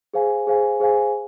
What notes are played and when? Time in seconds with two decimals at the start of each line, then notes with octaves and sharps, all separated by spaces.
0.14 G#4 C5 F5 G#5
0.47 G#4 C5 F5 G#5
0.80 G#4 C5 F5 G#5